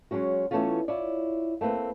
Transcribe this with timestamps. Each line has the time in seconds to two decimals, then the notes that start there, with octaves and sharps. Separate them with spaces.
0.11 F#3 G#3 C#4 F#4
0.51 E3 F#3 A3 B3 C#4 F4
0.88 E4 F4 C#5 D5
1.61 A3 A#3 C4 B4